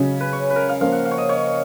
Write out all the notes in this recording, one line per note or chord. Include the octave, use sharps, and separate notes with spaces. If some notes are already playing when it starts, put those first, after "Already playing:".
Already playing: C#3 F#3 C#4 D#5
B4
C#5
B4
A#4
F5
F3 A#3 C#4 F5
F#5
F5
C#5
D#5
C#5